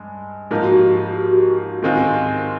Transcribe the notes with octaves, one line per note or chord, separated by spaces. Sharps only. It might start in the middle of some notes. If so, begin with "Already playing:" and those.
Already playing: G2 G#3
G#2 F3 A#3 D#4 G#4
F#4
G4
F4
G4
F#4
G4
G#2 D#3 G#3 C4 F4